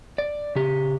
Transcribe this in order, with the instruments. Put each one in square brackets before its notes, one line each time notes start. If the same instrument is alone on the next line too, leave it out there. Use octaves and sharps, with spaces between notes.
[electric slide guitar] D5
C#3 G4